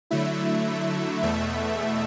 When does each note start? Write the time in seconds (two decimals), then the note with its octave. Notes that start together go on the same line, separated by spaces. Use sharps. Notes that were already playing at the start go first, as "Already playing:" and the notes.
0.11 D3 F#3 A3 E4 E5
1.23 E2 B2 A3 E5